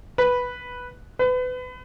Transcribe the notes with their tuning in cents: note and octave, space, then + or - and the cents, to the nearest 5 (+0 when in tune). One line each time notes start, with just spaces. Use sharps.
B4 -5
B4 +30